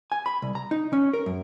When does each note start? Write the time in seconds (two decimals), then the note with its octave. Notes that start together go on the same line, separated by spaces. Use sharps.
0.12 G#5
0.26 B5
0.42 C2
0.55 A#5
0.71 D#4
0.93 C#4
1.13 A#4
1.26 F#2